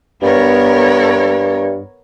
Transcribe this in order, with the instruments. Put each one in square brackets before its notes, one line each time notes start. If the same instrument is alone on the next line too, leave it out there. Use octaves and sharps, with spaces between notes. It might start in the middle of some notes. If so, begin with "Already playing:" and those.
[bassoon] G2 [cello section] B3 A#4 C#5